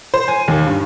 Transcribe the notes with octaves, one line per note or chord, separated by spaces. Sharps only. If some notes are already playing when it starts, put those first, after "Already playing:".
C5
G#5
D#2
G2